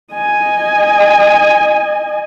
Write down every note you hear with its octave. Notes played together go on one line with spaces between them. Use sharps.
D#5 G#5